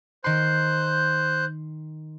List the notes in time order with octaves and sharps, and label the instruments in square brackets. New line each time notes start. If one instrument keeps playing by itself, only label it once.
[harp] D#3 C6 [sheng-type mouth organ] C5 F#6 G6